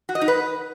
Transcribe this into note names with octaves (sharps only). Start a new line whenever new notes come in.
F#4
D#5
D#4
B4